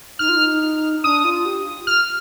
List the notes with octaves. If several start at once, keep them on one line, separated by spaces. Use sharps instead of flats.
D#4 F6
F4
D#4
D4 D#6
F4
G4
F6